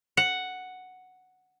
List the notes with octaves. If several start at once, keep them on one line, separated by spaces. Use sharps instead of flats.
F#5